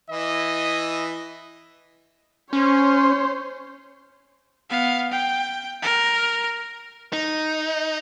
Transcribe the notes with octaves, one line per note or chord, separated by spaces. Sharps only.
E3 E4 D#5
C#4 C5 C#5
B3 F5
G5
A#4
D#4